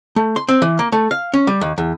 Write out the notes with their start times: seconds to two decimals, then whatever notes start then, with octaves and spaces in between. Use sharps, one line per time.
0.16 A3
0.36 C6
0.48 C4
0.62 E3
0.79 A#3
0.92 A3
1.11 F5
1.34 C#4
1.47 G3
1.61 D#2
1.78 E2